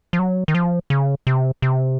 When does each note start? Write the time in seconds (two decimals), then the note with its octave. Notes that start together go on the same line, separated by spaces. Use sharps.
0.13 F3
0.19 F#3
0.48 D#3
0.55 F3
0.90 C#3
1.27 C3
1.62 C3